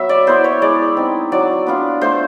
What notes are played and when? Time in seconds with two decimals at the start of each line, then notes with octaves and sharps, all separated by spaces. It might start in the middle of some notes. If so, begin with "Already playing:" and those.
Already playing: F#3 B3 E5
0.09 D5
0.27 B3 E4 C5
0.44 C#5
0.62 G#3 D5
0.97 C4 D#4
1.32 F#3 D5
1.66 B3 D4 F4
2.01 A3 C5